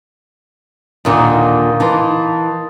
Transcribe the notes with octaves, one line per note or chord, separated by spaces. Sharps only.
D#2 A#2 D3 A#3 D#4
E3 D#4 A5 C6